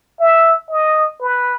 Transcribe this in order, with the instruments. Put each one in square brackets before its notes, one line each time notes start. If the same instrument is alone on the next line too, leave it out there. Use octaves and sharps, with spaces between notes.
[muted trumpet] E5
D#5
B4